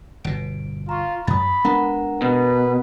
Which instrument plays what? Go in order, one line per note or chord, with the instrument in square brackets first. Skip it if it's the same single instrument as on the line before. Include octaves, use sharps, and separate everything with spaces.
[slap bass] G1 B2 [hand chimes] D7
[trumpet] F4 [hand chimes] A#5 C#6
[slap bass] F#2 [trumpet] B5 [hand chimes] D#6 A6
[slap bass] G#3 B3 D4 [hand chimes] A#4 F#5 A#5
[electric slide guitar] B2 [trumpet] B4